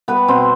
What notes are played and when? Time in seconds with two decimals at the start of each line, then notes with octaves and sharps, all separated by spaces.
0.08 G3 B3 B4
0.28 B2 C4 C5